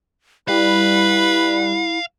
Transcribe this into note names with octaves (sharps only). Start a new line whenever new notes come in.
G3 E4 B4 F5